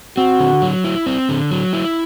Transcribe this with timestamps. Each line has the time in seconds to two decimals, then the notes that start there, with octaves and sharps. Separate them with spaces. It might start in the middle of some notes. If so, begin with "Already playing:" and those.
0.17 C4 F#4
0.40 D3
0.62 F#3
0.84 E4
1.06 C4
1.29 D3
1.51 F#3
1.73 E4